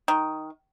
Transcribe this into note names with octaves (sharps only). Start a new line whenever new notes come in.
D#3